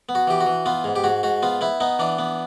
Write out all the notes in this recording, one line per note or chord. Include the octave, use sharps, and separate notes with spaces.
B3
F#4
E3 G4
F#4
E3
B3 F4
G#2
G4
G#2 F#4
G#2 F#4
B3 F4
B3 E4
B3 D#4
E3 D4
B3